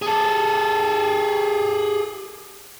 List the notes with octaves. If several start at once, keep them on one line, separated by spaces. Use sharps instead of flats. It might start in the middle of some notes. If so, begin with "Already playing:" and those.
G#4 A4